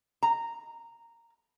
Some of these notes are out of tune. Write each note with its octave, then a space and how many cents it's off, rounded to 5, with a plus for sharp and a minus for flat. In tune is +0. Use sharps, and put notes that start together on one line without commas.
A#5 -10